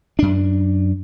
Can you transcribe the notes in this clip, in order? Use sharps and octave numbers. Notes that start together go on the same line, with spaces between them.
F#2 D4